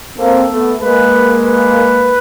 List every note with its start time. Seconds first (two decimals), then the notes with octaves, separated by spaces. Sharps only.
0.17 A#3 C4 A4
0.50 A3 B3
0.81 G#3 A#3 B4
1.44 B4